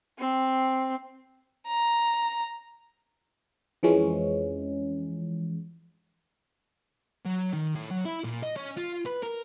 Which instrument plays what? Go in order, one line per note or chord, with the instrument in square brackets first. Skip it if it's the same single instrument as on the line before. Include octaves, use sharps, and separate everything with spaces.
[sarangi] C4
[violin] A#5
[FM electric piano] F2 E3 F3 G#3 C#4
[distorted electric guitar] F#3
D#3
A2
F#3
E4
A#2
D#5
C#4
F4
B4
A#4